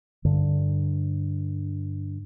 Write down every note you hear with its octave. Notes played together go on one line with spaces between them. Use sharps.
G2 D3